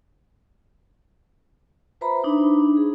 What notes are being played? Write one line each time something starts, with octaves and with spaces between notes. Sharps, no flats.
F4 B4 C5 E5 A#5 B5
D4 D#4
G#4